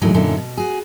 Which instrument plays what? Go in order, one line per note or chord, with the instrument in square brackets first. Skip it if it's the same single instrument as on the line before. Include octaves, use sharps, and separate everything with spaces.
[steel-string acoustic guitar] D#2 A2 E3 F#3 G#3 D#4
F#2 A#2 D3 C#4 D#4 E4
B2
F#4 G#4